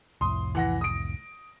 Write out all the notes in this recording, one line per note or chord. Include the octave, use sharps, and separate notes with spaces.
C2 F2 A2 C6 D#6
E3 F#5 A#6
D#6 D7